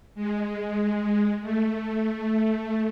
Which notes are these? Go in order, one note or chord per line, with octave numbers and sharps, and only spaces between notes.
G#3
A3